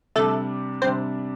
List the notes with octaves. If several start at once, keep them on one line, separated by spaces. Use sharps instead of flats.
C3 G3 A3 D4 A4
C3 G3 C4 D4 C5